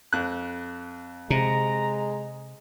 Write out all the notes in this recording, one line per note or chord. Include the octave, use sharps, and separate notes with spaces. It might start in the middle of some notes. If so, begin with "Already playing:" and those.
F2 F#6
C3 G#3 A#5